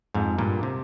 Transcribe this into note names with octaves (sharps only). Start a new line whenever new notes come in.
F2 G#2
G2 A#2
C3